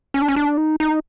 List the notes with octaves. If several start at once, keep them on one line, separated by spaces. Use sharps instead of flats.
C#4
D4
C#4
D4
D#4
D#4